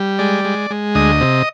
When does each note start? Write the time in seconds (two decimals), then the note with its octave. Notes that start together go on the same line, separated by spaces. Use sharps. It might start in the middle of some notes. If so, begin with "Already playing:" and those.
Already playing: G3
0.19 G#3 D5
0.45 G#3
0.71 G#3
0.95 D2 D#5
1.21 C3